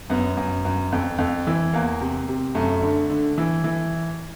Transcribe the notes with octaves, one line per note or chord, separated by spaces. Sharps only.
F#2 B3
F#2
F#2
F2
F2
E3
E2 A#3
C3
C3
F#2 A3
D3
D3
E3
E3